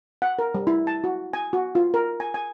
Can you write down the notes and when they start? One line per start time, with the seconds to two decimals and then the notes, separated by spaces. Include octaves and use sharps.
0.22 F#5
0.39 A#4
0.55 G3
0.67 E4
0.87 A5
1.04 F#4
1.33 G#5
1.53 F#4
1.75 F4
1.94 A#4
2.20 G#5
2.34 G#5